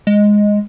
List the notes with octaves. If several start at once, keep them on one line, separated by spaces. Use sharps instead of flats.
G#3